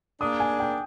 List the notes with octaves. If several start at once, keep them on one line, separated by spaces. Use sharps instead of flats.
A#3 D4 G#4 D#6
G#5
G5